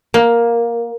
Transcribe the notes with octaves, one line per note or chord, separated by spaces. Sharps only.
A#3